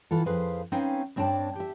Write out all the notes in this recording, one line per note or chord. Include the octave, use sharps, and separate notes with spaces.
E3 F4 A4
F2 G#4 B4 C5 F5
C4 C#4 D#4 B4 F5
G2 C4 D4 C#5 A5
G4 E5